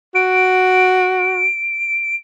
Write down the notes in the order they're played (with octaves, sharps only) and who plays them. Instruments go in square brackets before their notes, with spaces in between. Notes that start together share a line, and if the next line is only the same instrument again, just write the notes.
[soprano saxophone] F#4 [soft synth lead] D7